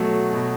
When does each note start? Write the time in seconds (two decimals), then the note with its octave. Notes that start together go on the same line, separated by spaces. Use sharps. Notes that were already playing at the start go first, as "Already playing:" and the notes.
Already playing: B2 F#3 A3 F#4
0.32 B2